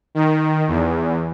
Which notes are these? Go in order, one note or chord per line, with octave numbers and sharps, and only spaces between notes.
D#3
E2